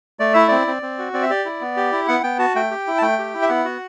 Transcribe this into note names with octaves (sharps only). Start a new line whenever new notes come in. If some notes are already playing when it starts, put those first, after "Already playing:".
A3 D5
E4 E5
C4 D5
C4
C4
F#4
C4 D5
E5
G4 D5
E4
B3
G4
E4
B3 F#5
B3 G5
F#4 A5
A3 G5
G4
E4
A5
A3 G5
G4
E4
E5
B3 F#5
F#4